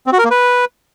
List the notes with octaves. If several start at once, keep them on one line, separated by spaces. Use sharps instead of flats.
C4
F#4
A#4
A#3
B4